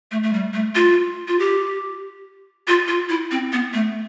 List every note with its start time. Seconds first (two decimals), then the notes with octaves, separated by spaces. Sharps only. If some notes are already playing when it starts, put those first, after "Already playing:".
0.11 A3
0.23 A3
0.33 G3
0.54 A3
0.75 F4
1.28 F4
1.39 G4
2.67 F4
2.88 F4
3.09 E4
3.31 C4
3.53 B3
3.74 A3